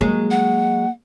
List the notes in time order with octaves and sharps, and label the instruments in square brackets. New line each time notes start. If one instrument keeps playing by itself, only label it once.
[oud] F#3 G#3 G#4 [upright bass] A#3
[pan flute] F#5